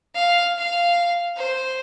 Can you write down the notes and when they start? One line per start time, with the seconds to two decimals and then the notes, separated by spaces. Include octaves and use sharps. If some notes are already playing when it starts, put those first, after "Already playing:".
0.15 F5
0.58 F5
1.37 C5